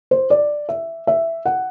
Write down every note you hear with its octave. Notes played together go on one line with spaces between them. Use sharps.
C5
D5
E5
E5
F#5